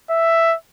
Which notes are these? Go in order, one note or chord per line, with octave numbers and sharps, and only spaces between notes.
E5